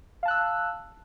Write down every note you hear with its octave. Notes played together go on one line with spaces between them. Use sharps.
F5 A5 E6 F#6